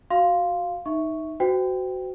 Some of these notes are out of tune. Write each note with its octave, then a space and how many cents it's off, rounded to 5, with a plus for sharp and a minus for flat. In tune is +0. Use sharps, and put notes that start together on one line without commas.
F#4 +0 F5 +0 C6 +0
D#4 +0 E5 -10 C#6 +0
F#4 +10 C5 -40 G5 +0